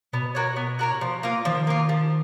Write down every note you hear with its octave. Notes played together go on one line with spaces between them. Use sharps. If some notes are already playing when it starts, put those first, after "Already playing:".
B2 B3
F#4 A#4 C#5
B3
F#4 A#4 C#5
F3
A#3 F4
D#3 F3
A#3 F4
F3